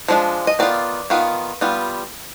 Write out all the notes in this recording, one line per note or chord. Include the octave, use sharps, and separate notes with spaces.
F3 G#3 D4 F4
D#5
D#3 B3 F4 D5
D#3 B3 F4
G3 B3 F4